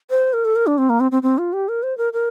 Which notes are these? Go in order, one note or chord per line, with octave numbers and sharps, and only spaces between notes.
C5
A#4
A4
A#4
D4
C4
A#3
C4
C4
C4
F4
G4
A#4
C5
A#4
A#4